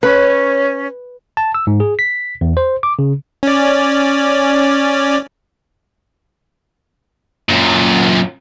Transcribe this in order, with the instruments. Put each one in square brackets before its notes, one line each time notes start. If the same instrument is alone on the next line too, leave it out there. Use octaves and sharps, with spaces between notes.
[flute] C#4 [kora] B4 [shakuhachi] C#5
[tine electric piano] A5
E6
G#2
G#4
B6
E2
C5
D6
C#3
[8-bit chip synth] C#4 D5
[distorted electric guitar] F#2 A#2